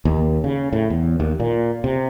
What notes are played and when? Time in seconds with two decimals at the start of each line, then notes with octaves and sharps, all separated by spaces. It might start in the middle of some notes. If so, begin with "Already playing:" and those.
0.05 D#2
0.44 C#3
0.73 A2
0.90 E2
1.20 D#2
1.40 A#2
1.84 C3